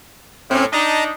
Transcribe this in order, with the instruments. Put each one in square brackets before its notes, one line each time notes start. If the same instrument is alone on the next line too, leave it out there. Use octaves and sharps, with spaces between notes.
[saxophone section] A2 [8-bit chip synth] C4 C#4
[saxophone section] D4 D#4 [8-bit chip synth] D#5 A5 A#5